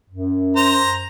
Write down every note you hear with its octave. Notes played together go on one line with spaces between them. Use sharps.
F#2
C5 A#5